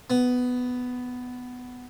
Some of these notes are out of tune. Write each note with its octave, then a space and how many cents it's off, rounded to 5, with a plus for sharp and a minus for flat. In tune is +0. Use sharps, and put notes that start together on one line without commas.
B3 +10